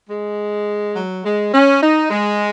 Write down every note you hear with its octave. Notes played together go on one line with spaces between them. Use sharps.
G#3
F#3
G#3
C#4
D#4
G#3